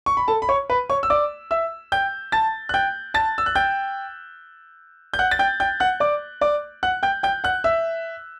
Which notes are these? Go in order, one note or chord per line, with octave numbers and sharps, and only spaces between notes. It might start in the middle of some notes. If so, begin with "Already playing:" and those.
C#6
B5
A4 A5
B5
C#5 C#6
B4 B5
C#5 C#6
E6
D5 D6
E5 E6
G5 G6
A5 A6
F#6
G5 G6
A5 A6
E6
F#6
G5 G6
G6
F#5 F#6
A6
G5 G6
G5 G6
F#5 F#6
D5 D6
D5 D6
F#5 F#6
G5 G6
G5 G6
F#5 F#6
E5 E6